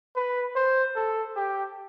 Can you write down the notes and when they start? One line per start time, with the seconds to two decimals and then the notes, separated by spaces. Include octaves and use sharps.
0.16 B4
0.55 C5
0.95 A4
1.36 G4